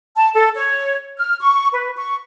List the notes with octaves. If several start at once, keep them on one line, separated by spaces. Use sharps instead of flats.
A5
A4
C#5
F6
C#6
B4
C#6